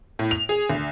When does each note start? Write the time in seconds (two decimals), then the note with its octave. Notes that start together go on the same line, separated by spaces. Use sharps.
0.19 A2
0.31 F7
0.49 G#4
0.70 D2